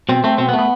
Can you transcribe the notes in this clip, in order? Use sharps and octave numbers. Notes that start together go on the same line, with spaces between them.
B2 C4
A3 C4
B2 C4
B3
A3
B3